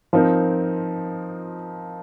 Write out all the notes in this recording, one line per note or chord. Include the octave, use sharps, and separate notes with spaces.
F3 C4 D#4 A#4